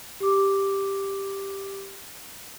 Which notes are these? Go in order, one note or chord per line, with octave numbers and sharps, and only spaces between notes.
G4 D6